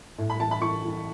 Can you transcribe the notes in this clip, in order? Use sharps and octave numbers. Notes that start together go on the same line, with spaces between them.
A2
B5
E3 A5
B5
E3 C#6
E3